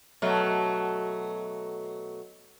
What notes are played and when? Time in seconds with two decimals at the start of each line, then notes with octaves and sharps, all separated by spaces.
0.22 B2 F#3 A3